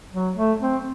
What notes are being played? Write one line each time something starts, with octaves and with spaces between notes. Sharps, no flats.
F#3
A3
C4